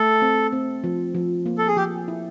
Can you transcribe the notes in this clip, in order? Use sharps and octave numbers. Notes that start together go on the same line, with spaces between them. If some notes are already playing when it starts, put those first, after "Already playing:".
Already playing: A3 A4
C4
C4
F3
F3
A#3
A4
G#4
F3 G4
E4